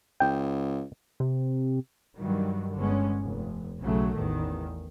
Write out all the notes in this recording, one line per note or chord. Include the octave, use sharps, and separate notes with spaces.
C#2 G5
C3
G2 D#3 F#3 G3
G1 D3 G#3 B3 C#4
F1
B1 C#3 F#3 A3
A1 E2 D#3